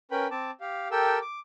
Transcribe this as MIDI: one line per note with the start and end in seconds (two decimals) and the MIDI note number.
0.11 0.27 61
0.11 0.27 70
0.11 0.27 71
0.11 0.27 79
0.11 0.27 83
0.31 0.51 60
0.31 0.51 81
0.31 0.51 86
0.61 0.88 67
0.61 0.88 77
0.91 1.19 67
0.91 1.19 69
0.91 1.19 70
0.91 1.19 79
0.91 1.19 88
1.21 1.39 86